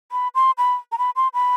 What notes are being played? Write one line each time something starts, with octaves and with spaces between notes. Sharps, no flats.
B5
C6
B5
A#5
B5
C6
B5